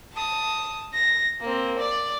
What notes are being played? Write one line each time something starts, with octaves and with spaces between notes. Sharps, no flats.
A5 D#6
A#6
A#3 C4
D5